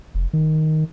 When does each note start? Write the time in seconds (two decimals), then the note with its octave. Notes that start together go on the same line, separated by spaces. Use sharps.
0.15 F1
0.33 D#3